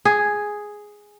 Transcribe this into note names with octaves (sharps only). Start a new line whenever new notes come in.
G#4